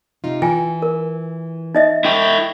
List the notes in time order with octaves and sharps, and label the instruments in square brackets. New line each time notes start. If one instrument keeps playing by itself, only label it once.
[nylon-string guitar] C3 D#4 F4
[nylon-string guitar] E3 [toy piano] F4 G5 G#5
[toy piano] A#4
D#4 D#5 E5
[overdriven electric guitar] E4 G5